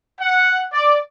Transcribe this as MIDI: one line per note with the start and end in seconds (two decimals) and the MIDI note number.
0.20 0.65 78
0.73 0.98 74